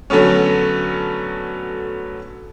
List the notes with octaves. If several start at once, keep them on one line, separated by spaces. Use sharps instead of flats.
D3 F#3 A3 B3 C#4